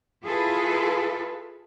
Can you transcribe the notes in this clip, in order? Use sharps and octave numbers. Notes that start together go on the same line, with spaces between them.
E4 F4 G#4 A4 B4